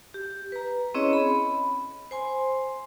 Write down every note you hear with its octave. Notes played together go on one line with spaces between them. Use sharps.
G4
B4 A#5
C4 C#4 E4 G#4 C#5 D#5
B5
C5 G#5 C6